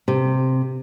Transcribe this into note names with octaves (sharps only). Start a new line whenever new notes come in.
C3